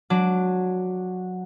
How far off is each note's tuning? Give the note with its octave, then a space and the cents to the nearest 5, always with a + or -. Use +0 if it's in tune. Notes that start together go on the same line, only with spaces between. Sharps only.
F#3 -15 D4 +0 D6 +0